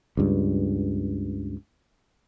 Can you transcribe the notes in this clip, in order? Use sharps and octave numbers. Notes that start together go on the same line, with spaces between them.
C#2 G2